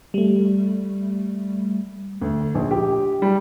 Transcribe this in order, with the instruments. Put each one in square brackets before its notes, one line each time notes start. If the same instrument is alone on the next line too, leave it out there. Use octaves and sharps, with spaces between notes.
[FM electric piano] G3 A3
[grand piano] D2
A#1
G4
G3